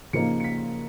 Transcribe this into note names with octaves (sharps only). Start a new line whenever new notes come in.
C#3 F3 A#3 D#4 C#7
C#7
B6